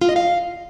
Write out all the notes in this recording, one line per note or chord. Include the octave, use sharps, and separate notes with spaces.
F4
D#5
F5